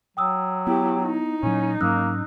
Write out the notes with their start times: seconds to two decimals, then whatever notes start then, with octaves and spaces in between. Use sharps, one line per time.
0.17 F#3 G5 D#6 E6
0.67 B3 E4 G4
1.03 D#4 E4
1.43 A#2 F#3 C#4
1.81 G#2 F#3 A#3 C#4 D#6 E6 F#6